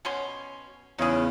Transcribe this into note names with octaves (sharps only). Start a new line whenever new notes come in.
B2 C#4 C6
E2 C#3 D#4 G#4